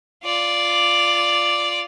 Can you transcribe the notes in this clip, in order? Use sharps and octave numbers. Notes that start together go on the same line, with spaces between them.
F4 D5